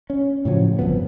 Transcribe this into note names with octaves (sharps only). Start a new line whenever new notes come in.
C#4
A2 C#3 F3 F#3
G1 F2 F3 B3